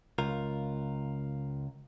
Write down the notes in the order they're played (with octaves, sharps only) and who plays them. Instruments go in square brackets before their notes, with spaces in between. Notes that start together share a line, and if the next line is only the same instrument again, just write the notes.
[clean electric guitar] C#2 F4 A#4